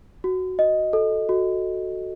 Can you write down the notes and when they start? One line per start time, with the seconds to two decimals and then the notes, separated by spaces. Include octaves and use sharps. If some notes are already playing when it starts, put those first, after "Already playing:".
0.24 F#4
0.59 D#5
0.93 A4
1.29 F#4